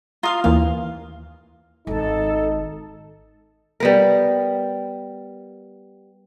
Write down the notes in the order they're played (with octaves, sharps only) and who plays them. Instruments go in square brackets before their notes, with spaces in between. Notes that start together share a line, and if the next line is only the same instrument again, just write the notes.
[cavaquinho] F4 F5 C6 [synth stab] A#5 D#6
[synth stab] D#2 E3 A#3 [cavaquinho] F5
[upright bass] G#1 D#3 [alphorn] D#4 [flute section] A4
[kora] G3 B3 A#4